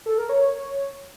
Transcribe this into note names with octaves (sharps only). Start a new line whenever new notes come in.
A4
A#4
C#5